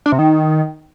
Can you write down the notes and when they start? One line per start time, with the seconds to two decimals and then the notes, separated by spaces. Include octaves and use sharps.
0.06 D4
0.12 C3
0.19 D#3